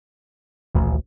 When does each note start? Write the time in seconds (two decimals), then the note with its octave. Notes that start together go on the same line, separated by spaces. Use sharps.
0.75 D#1 A1 D2